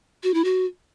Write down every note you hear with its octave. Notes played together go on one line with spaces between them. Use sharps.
F#4
E4
F#4